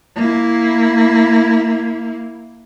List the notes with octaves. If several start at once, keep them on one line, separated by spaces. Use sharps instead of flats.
A#3 E4